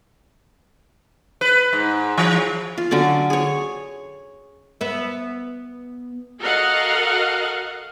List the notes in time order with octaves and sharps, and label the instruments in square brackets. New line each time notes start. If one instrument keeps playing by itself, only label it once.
[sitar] B4
G#2
E3
[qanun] F4
D3 F#3 C#4 D5
G#4 C#5
[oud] B3 E5
[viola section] F#4 A4 A#4 D#5 F5 F#5